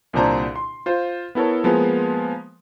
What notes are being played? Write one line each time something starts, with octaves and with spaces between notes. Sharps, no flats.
C2 A#2 D3 D4 C5 A#5
C6
F4 C5
B3 E4 A4 A#4 C#5
F3 G#3 A#3 B3